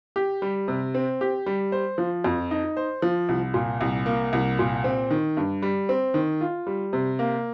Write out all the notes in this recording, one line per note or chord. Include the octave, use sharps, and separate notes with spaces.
G4
G3
C3
C4
G4
G3
C5
F3
F2
D#4
C5
F3
C2
A#2
C2
A#3
C2
A#2
C4
D#3
G2
G3
C4
D#3
F4
G3
C3
A#3